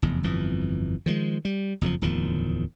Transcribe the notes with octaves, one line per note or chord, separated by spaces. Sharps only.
F1 E2
G1 F2 E3
D#3 F3 F#3 G#3
G3
F#1 F2 C#3 F3
D1 E2 D#3 F3